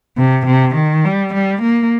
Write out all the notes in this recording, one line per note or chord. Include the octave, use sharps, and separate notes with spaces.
C3
C3
D#3
G3
G3
A#3